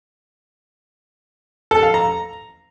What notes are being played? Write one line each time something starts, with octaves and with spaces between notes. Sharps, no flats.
A4
F5
A#5